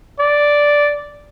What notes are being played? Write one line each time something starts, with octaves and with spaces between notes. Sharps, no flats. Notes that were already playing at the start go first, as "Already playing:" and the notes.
D5